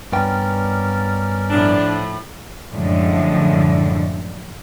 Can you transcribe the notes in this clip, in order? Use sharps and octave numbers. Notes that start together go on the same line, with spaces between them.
G2 B3 C#4 A#4 D5 G5
A2 F3 D4
F#2 A2 D3 F3 G#3